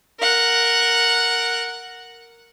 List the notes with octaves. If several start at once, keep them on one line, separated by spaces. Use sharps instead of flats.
A#4 F#5